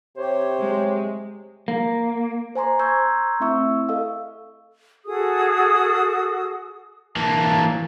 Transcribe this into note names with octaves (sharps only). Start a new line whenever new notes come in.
C3 G4 C5 C#5
G#3
A#3
C5 G#5 A#5 C6 D6
A#5 C6 C#6 E6 G6 G#6
A3 C4 E4 E5 C#6 E6
A4 D#5 F5 E6
F#4 G#4 A4 D#6
E3 A#3 A5